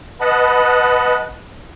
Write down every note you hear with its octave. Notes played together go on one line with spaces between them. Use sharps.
B4 D#5 F#5 A5 B5